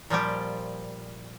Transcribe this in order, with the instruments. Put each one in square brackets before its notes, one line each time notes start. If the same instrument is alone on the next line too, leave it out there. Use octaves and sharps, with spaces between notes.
[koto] A#2 F3 G3 G4